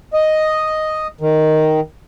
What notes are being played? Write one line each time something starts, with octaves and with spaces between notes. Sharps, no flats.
D#5
D#3